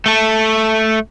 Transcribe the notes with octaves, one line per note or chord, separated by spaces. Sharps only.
A3 A4